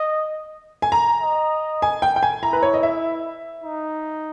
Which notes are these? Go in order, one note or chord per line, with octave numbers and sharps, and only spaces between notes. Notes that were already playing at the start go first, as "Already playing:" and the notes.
Already playing: D#5
G#5
A#5
D#5
G#5
G5
G5
G#5
E4 A#5
B4
C#5
D#5
E5
D#4